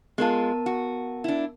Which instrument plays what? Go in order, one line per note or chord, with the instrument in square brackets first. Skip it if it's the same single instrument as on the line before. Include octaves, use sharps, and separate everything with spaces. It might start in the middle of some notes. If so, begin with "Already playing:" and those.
[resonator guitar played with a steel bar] G#3 F4 [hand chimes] B3 A#4 A5
[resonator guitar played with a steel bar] F#4
D4 E4